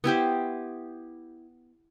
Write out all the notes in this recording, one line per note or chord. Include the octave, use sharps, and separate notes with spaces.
B3 E4 G4 C5